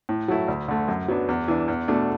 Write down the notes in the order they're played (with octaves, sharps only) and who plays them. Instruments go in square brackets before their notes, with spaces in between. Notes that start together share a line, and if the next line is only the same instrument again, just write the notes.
[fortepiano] A2
F#3 A3 E4
D2
D3 A3
F#2
F#3 B3 D4
E2
E3 D4
E2
B2 A3 D4